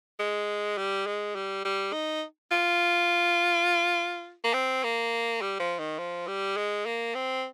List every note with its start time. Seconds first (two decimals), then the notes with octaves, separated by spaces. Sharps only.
0.19 G#3
0.78 G3
1.06 G#3
1.35 G3
1.65 G3
1.93 D#4
2.51 F4
4.44 A#3
4.54 C4
4.84 A#3
5.42 G3
5.60 F3
5.79 D#3
5.98 F3
6.28 G3
6.57 G#3
6.86 A#3
7.15 C4